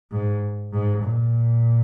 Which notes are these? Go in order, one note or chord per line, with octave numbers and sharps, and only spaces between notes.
G#2
G#2
A#2